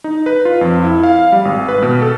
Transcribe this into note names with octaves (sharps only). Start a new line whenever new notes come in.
D#4
B4
F4
F2
E4
F5
G3
G#1
B4
B2
A4